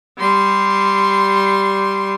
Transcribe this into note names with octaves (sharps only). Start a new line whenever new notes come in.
G3 C6